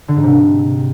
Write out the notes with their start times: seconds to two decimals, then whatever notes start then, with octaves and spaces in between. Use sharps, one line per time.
0.08 D3
0.16 G#2
0.24 C3